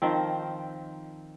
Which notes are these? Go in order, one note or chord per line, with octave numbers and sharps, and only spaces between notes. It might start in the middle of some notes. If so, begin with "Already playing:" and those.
D#3 F3 C4